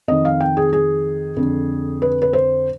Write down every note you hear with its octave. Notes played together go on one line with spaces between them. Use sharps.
F2 D#3 D#5
F5
G5
G#4
G#4
F2 D3
B4
B4
C5